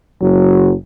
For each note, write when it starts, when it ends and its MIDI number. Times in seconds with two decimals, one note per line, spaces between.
0.22 0.74 30
0.22 0.74 54